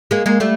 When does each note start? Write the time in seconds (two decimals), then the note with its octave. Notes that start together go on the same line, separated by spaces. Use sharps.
0.11 G#3 A#3
0.26 G#3 A#3
0.40 G3 A3